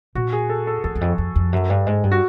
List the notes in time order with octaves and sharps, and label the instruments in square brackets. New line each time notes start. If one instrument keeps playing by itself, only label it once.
[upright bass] A#2 [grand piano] F#4
[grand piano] G#4
A4
A4
[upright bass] E2 [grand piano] A4
[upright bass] E2
F2
F2
F2
F#2
G2
G#2
G2
[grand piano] F#4